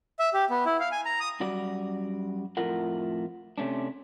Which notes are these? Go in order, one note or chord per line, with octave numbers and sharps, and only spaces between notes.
E5
G4
B3
E4
F5
G#5
A#5
D#6
F#2 G3 F#4 D5
F2 A2 A3 F4 A#4 F#5
C3 A3 C#4 D4